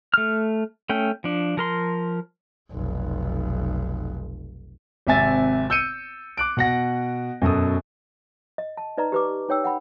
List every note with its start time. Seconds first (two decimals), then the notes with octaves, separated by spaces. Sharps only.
0.14 A3 F6
0.89 A3 C#4 G5
1.24 F3 D4
1.57 F3 A#4 C6
2.71 F1 B1
5.07 G#1 C3 E5 G#5 A6
5.70 E6 G6 C#7 D#7
6.37 D6 F#6 D7
6.57 B2 F#5 A#6
7.42 F#2 B2 A4 D#6
8.58 D#5
8.77 A5
8.97 D#4 B4 D5 D#5 A#5
9.12 G4 B4 D6
9.49 D#4 C#5 G5 E6
9.64 F#5 G5 B5